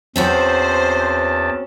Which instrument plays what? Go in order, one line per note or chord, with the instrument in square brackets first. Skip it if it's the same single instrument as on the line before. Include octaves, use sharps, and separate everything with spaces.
[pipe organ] E2 A5 [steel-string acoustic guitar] C4 C#4 F#4 [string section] C5